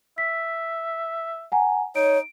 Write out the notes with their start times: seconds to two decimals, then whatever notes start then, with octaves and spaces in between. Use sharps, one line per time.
0.18 E5 B6
1.52 F#5 G#5 A#5
1.96 D#4 C#5 D7